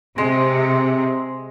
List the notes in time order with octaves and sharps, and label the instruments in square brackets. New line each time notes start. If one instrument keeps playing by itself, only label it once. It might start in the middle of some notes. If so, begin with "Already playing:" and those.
[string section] C3 [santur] G#3